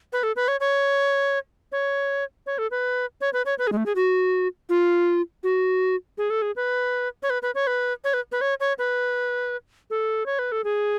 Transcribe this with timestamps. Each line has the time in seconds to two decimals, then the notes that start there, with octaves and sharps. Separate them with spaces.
0.13 B4
0.23 A4
0.36 B4
0.48 C#5
0.60 C#5
1.72 C#5
2.46 C#5
2.58 A4
2.71 B4
3.21 C#5
3.33 B4
3.46 C#5
3.59 B4
3.67 G#4
3.72 G#3
3.77 A3
3.86 G#4
3.96 F#4
4.69 F4
5.43 F#4
6.18 G#4
6.30 A4
6.42 G#4
6.56 B4
7.23 C#5
7.30 B4
7.42 B4
7.55 C#5
7.67 B4
8.04 C#5
8.14 B4
8.32 B4
8.41 C#5
8.60 C#5
8.79 B4
9.90 A4
10.26 C#5
10.39 B4
10.52 A4
10.64 G#4